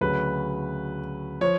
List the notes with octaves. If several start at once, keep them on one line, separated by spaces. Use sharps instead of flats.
D2 C#3 F#3 B4
F3 C#5